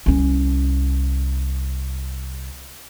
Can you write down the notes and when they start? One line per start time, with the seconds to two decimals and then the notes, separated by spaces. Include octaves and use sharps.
0.06 C2 C#4